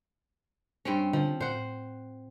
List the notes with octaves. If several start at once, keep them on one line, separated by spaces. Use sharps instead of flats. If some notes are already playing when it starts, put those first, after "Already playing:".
G2 C4 C#4
D3 F3
A2 C5 F#5